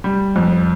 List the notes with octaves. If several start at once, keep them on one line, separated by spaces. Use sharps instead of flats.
G3
F2